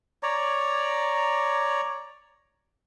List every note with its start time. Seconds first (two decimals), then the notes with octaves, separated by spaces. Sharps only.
0.23 C#5 D5 A#5